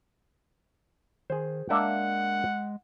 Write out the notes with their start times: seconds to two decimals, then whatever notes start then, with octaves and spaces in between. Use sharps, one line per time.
1.30 D#3 G#4 C5
1.70 G#3 A#3 D4 E5 F#5